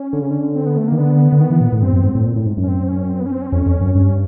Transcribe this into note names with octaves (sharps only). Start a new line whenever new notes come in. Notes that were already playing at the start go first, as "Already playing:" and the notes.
Already playing: C#4
D3
C#3
D3
C4
B3
A3
D#3 A#3
D3 B3
D3
D#3
E3
A#2
A2
G2 C4
F#2
G#2
A2
A#2
A2
G#2
F#2
C#4
C4
C#4
C4
B3
C#4
C4
C#4
C4
F2 C#4
F2
F#2
G2 C#4